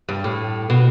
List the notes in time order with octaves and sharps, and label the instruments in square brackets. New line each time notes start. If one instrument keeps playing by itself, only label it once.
[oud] G2
A2
B2